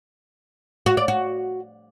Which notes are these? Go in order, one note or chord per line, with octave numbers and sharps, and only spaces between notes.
F#4
D5
F#4